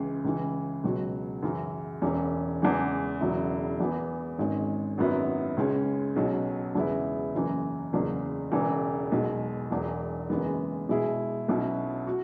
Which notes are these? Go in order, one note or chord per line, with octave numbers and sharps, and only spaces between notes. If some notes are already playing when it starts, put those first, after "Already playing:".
Already playing: C#2 C#3 E3 G#3
C#2 C#3 E3
C#2 B2 F#3
F#2 C#3 E3
E1 E2 E3 C#4
E2 C#3 E3 G#3
E1 E2 C#3 F#3 E4
E2 E3 B3
G#1 G#2 G#3 C#4 G#4
G#1 F#2 F#3 B3 E4
C#2 C#3 G#3 C#4
B1 B2 F#3 C#4 G#4
E2 C#3 G#3 B3 E4
F#1 F#2 E3
F#1 E2 C#3
E1 E2 C#3 E3
B1 B2 G#3
E1 E2 E3
F#1 F#2 E3 G#3 B3
B2 G#3 E4 G#4
B1 B2 F#3 C#4 E4
F#4